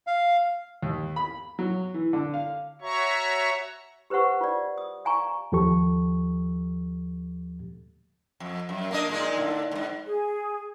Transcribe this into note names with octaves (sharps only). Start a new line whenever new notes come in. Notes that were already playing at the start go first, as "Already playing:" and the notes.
F5
D#2
B5
F#3
E3
D3
F5
F#4 C#5 E5 A#5 C#6
G4 B4 C5 E5 F#5 C#6
F4 D5
D#6
D5 F5 G#5 A#5 C#6
D#2 F3 G4 A4 C#6
F2
F#2
A#3 D4 D#5
A#2 G#3 D#4
A2 D3
D#2 G#2
G#4